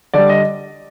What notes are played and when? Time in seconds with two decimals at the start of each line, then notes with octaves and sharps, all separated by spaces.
0.14 D3 G3 D5
0.29 D#5